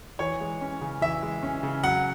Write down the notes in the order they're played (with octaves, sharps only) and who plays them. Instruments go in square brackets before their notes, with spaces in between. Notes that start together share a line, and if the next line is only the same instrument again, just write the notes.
[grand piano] E3 C#5
G#3
C#4
C#3
E3 E5
G#3
C#4
C#3
F#3 F#5